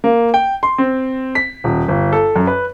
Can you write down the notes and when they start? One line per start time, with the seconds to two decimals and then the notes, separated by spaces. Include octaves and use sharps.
0.04 A#3
0.34 G5
0.63 C6
0.78 C4
1.35 B6
1.64 D#1
1.88 G1
2.13 A4
2.36 F#2
2.47 B4